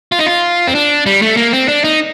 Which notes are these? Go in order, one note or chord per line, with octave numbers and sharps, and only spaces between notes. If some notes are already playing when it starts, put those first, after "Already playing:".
F4
D#4
F4
C4
D4
G3
A3
A#3
C4
D4
D#4